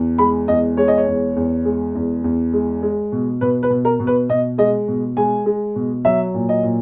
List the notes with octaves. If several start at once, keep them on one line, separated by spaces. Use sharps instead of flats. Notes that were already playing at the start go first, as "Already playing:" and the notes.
Already playing: E2
G#3 B5
E2 D#5
G#3 C#5
D#5
C#5
E2
E2
G#3
E2
E2
G#3
G#3
B2
B2 B4
B4
B2
A#4
B2
B4
B2 D#5
G#3 D#5
B2
G#3 G#5
G#3
B2
F#3 E5
A#2
D#5
A#2